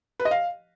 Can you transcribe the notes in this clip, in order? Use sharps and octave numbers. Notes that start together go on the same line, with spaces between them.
B4
D#5
F5